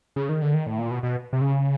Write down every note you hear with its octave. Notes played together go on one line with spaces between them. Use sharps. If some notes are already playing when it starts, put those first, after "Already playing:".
C#3
D#3
D3
D#3
A2
A#2
B2
B2
C3
C#3